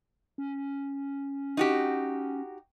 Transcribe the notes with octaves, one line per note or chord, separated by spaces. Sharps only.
C#4
D#4 F#4 G4